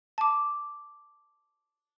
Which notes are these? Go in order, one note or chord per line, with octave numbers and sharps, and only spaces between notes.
A5 D6